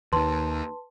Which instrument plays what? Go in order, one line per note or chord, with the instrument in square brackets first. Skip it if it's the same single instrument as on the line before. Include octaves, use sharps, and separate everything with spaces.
[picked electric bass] D#2 D#3 [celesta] B4 A5 C6